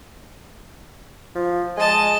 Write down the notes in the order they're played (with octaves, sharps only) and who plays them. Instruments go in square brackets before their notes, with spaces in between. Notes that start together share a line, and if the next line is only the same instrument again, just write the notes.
[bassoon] F3
[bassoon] G#3 [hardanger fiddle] D#5 A5